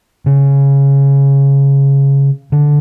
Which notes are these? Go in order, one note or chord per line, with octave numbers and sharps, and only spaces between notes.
C#3
D3